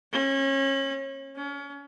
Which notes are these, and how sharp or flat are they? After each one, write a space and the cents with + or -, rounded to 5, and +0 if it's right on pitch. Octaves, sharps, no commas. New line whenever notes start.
C#4 -30
C#4 +35